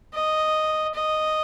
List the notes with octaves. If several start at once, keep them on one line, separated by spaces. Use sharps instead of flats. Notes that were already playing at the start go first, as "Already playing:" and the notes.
D#5
D#5